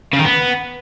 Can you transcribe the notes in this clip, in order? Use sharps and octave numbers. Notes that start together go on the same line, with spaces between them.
C#3
D#3
B3